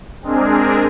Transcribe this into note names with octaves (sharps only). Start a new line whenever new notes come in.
G#3 C4 D4 G#4 A#4